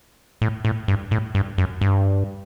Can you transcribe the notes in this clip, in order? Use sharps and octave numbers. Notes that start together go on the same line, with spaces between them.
A2
A2
G2
A2
G2
F#2
G2